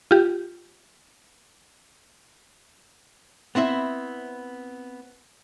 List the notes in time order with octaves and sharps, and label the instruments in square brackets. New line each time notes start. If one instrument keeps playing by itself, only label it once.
[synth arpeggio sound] F4 G4
[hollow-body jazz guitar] B3 C4 E4 E5